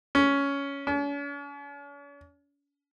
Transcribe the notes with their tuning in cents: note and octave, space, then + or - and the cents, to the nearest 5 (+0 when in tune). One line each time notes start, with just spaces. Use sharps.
C#4 +10
C#4 +45